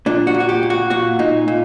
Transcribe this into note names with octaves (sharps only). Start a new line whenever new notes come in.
A#2 D4
F#4
A#2
F#4
G4
A#2
F#4
A#2 F#4
A#2 D#4
A#2